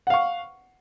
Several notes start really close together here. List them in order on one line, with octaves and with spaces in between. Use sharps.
F#5 F5 C#6